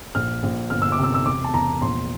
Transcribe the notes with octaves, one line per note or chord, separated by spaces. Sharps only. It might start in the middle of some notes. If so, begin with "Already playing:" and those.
A#1 F6
A#1
G1 F6
E6
D6
C3
E6
E6
E1 D6
A5
E1 A#5
A#1 C6